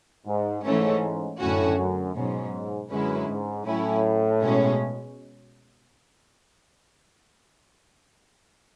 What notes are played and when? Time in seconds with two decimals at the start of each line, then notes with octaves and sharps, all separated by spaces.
0.26 G#2
0.64 G#2 E3 A3 C#4
1.39 F#2 A2 D3 A3 C#4 F#4
1.77 F#2
2.15 G#2 B2 F#3 C#4
2.90 F#2 D3 G#3 C#4 E4 B4
3.28 G#2
3.65 A2 F#3 A3 C#4 E4
4.41 B2 G#3 C#4